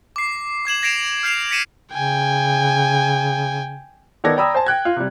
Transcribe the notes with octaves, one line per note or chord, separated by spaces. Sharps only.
D6 C7
D6 G#6 E7 F#7
G#6 A#6 C7 D7 E7 F7
F6 G6 C7 E7 F7
A#6 B6 C#7 D#7 E7
C#3 G5 G#5
D#3 B3 A4 D5 G#6 A#6
D5 G5 A#5 B5 D#6 E6
C5 G#5 A5
G5 F#6 G#6
F4
C3 G3